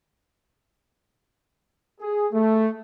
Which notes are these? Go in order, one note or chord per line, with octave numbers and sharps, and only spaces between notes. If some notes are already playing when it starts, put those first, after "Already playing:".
G#4
A3